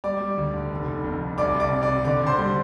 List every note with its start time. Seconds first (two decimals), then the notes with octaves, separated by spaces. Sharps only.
0.04 G3 D5 D6
0.20 G3
0.37 D2
0.54 D3
0.70 F1
0.88 F1
1.04 F2
1.21 F1
1.38 C2 D5 D6
1.54 C2
1.60 D5 D6
1.71 C3
1.82 D5 D6
1.88 C3
2.05 D3 D5 D6
2.21 D3
2.27 C5 C6
2.38 G3